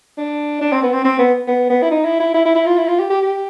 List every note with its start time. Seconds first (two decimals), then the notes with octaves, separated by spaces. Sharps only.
0.17 D4
0.61 D4
0.72 C4
0.82 B3
0.93 C4
1.04 C4
1.18 B3
1.48 B3
1.69 B3
1.82 E4
1.91 D#4
2.05 E4
2.20 E4
2.34 E4
2.45 E4
2.55 E4
2.66 F4
2.77 E4
2.88 F4
2.99 G4
3.10 G4
3.21 G4